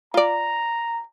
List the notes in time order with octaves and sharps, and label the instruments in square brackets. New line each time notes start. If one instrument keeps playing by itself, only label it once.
[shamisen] F4 D5 [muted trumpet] A#5